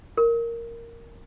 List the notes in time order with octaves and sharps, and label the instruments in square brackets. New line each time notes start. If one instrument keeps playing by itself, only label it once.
[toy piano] A#4